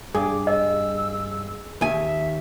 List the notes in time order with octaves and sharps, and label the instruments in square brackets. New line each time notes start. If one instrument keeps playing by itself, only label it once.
[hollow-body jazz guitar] G2 [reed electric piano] G#4 [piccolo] D6
[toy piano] D#5 [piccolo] E6
[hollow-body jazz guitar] D#2 G#5 [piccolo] E5